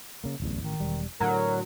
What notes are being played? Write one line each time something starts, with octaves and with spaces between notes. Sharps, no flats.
C#3 A#3
D1 A1 E2
A1 D#3
E1 G3
A2 D3 F#3 A#4